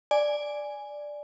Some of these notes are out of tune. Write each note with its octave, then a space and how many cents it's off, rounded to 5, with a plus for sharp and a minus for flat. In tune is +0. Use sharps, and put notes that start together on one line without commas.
D5 +0 G#5 +0